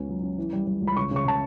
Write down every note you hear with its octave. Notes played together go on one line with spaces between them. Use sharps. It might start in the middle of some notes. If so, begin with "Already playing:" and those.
Already playing: C#2 B3 C#4
F#3
C#4
E3
G3
G3
C#2
B5
C#3 C#6
C#3 C#6
C#3 A5